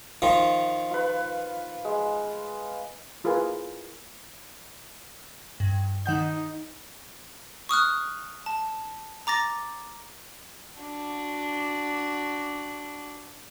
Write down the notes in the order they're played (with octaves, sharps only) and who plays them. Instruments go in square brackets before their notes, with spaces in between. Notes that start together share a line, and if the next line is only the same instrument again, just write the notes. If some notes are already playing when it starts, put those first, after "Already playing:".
[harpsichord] D#3 F3
[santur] F4 B4
G#3
[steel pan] E4 F4 G#4 A#4 B4 G#5
[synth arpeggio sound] G2
[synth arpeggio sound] D#3 F#5 G6 [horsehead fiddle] D#4
[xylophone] C#6 D#6 F6 F#6
A5
A#5 D6 A6 A#6
[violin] D4 F#4